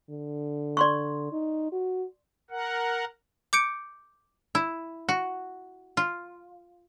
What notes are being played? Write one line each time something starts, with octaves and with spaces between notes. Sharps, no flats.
D3
D5 C6 C#6
D#4
F#4
A#4 F#5
D6 G6 C#7 D7
E4
F#4
F4